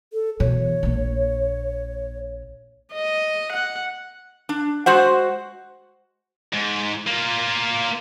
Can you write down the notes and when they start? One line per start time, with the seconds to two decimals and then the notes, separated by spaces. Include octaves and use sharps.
0.13 A4
0.40 B2 E3 C#5
0.83 A#1 A#3
2.93 D#5
3.52 F#5
4.49 D4
4.86 G#3 F#4 C5 F#5
6.53 G#2
7.07 A#3 F4